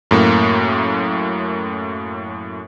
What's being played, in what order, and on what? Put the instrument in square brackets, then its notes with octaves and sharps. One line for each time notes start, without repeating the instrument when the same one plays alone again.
[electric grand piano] F#2 A2 A#3